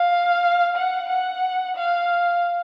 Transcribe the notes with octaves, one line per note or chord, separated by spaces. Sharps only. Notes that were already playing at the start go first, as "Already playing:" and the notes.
Already playing: F5
F#5
F#5
F5